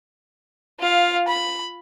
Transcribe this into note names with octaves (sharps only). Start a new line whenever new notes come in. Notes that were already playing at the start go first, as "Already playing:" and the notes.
F4 F5
B5